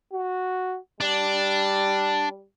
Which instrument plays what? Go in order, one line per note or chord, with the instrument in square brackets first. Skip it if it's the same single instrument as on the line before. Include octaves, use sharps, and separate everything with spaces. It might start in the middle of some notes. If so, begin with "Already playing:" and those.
[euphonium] F#4
[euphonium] G3 [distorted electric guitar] D4